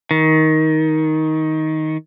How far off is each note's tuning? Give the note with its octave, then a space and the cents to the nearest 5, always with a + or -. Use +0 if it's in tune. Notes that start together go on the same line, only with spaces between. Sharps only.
D#3 +15